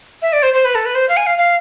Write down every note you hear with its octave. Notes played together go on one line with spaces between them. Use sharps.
E5
D5
C5
C5
B4
A4
B4
C5
F5
G#5
F5
F5